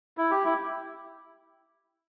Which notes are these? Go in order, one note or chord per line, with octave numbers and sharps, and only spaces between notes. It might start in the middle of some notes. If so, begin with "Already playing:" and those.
E4
G4
E4